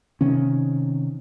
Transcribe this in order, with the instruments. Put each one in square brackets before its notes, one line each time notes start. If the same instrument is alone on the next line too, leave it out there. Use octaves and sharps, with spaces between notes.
[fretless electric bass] C3 D#3 C#4